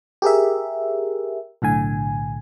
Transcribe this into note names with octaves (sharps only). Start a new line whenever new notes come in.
G4 G#4 A#4 E5
B1 A2 D3 G#5